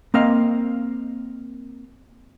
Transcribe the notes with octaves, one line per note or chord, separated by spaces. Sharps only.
A#3 C4 D#5 F5